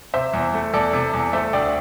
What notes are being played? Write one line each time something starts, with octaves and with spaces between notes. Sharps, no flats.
C3 C5 E5
E2
A3
E2 A4 D5
C3
E2
A3 C5 E5
D2 D5 G5